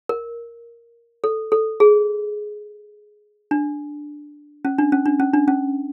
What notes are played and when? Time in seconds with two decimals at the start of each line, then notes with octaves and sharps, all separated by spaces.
0.09 A#4
1.24 A4
1.52 A4
1.80 G#4
3.51 D4
4.65 C#4
4.78 D4
4.92 C#4
5.06 D4
5.20 C#4
5.34 D4
5.48 C#4